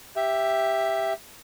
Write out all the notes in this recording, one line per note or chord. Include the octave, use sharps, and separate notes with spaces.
G4 E5